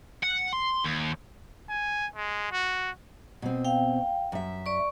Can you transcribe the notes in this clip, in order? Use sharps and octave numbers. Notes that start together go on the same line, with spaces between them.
F#5
C6
D#2
G#5
G#3
F#4
B2 C4
F5 G5
F#2 E5
D5 C#6